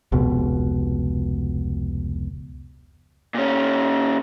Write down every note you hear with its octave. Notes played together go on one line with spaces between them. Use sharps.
F1 C#2 B2
A#2 C#4